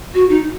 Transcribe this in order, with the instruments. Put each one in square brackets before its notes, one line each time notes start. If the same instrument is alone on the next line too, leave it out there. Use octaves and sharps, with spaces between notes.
[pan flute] F#4
D#4